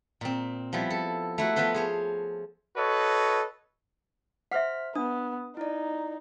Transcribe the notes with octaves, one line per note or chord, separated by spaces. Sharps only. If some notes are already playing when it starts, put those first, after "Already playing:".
A#2 C4
F3 G3 B3 E4
A4
A3 E4 F#4
F3 B3 F4 B4 C5
G#4 C5 C#5
F#4 A4 B4 C#5 D#5
C5 E5 F#5 F6 B6
B3 D4 D#6
D#4 E4 D5